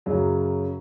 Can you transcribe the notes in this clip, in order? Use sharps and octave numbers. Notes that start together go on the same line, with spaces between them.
F#2 C#3 F#3